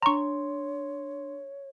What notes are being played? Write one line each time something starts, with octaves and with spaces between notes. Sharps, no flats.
D4 C#5 A#5 C6 C#6